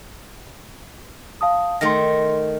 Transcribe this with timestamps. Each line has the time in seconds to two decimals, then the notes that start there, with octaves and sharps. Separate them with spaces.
1.41 F5 A5 D#6
1.81 D#3 A3 C6 A#6